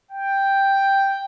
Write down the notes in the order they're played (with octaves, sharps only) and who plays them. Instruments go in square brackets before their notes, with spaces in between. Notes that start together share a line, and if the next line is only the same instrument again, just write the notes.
[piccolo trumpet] G5